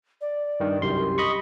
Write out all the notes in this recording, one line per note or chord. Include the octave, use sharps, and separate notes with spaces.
D5
G2 D#3
C2 F#2 G4 C6
D#5 B5 C#6